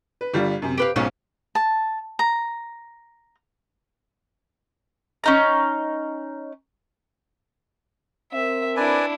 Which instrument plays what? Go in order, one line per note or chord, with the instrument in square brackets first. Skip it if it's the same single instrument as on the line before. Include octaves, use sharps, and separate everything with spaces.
[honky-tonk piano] B4
G1 G3 F4
F#2 C3
[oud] G4 B4 F5 [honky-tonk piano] D7
[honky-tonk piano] B1 [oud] G#2 C#4 F4
[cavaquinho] A5
A#5
[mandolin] C#4 D#4 A#5
[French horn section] C4 A#4 [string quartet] E5
[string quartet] D4 E4 [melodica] B4 D5 G#5